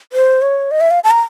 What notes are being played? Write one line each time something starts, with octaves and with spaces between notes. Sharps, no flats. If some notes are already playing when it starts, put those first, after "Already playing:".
C5
C#5
D#5
E5
F5
A5
A#5